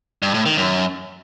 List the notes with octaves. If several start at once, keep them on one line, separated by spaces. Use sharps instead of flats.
G2
A2
D#3
F#2